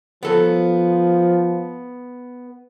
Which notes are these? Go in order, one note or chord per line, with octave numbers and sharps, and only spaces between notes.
F3 B3 A4